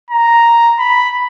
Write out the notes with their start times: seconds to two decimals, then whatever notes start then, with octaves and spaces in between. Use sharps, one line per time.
0.11 A#5
0.79 B5